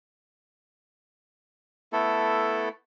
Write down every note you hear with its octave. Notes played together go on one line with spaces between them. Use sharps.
A3 B3 E4 A4